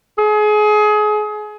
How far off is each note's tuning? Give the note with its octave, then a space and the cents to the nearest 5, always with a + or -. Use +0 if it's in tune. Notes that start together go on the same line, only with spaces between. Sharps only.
G#4 +30